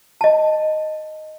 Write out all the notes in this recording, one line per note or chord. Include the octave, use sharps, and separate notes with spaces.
D#5 A5